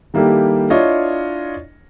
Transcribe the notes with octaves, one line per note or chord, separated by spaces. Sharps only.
D#3 G3 A#3 E4 G4 A4
D4 E4 F4 C#5 D#5